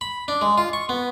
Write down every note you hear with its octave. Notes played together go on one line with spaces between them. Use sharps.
B5
D4
G#3
F4
C#6
B3